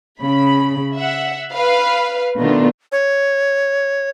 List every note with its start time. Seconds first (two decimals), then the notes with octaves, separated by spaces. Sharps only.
0.20 C#3 B5
0.96 E5 F#5
1.54 B4 F5
2.39 B2 D#3 A3 B3 D4 F4
2.92 C#5